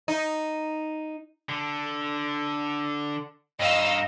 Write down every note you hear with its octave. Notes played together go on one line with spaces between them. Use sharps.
D#4
D3
G2 D#4 D#5 F5 E6